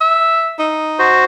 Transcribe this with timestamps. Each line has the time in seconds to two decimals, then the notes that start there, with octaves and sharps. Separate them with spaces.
0.01 E5
0.59 D#4
0.99 F#4 C5